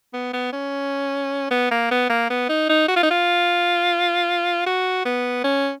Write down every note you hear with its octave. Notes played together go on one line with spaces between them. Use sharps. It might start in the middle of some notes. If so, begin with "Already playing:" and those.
B3
B3
C#4
B3
A#3
B3
A#3
B3
D#4
D#4
F#4
F4
D#4
F4
F#4
B3
C#4